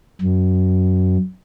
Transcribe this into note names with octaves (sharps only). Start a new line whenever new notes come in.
F#2